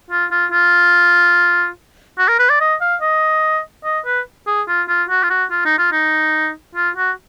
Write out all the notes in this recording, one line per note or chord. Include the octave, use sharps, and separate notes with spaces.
F4
F4
F4
F#4
A#4
B4
D5
D#5
F5
D#5
D#5
B4
G#4
F4
F4
F#4
F4
F#4
F4
D#4
F4
D#4
F4
F#4